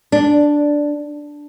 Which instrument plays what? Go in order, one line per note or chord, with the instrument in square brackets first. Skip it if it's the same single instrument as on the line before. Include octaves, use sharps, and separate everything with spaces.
[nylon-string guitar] D4